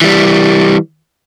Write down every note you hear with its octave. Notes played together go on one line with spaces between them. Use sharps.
E3 G3